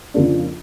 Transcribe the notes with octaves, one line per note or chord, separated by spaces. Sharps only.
F2 C#3 F3 A#3 D4